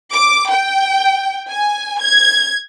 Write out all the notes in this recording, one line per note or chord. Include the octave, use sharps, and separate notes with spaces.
D6
G5
G#5
G#6